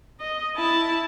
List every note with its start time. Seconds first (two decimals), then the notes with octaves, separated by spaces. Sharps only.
0.20 D#5
0.56 E4 A5